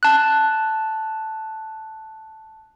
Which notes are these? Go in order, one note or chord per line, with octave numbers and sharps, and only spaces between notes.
A5 F#6